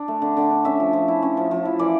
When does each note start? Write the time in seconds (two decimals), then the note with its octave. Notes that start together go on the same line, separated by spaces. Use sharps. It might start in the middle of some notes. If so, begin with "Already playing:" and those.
Already playing: D4 D5
0.08 A3
0.22 D3
0.37 D3
0.51 D4
0.65 C#4 E5
0.80 F3
0.93 F3
1.08 E4
1.23 C#4
1.37 F3
1.51 F3
1.65 E4
1.79 E3 D5